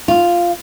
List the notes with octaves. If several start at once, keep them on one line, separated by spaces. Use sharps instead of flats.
F4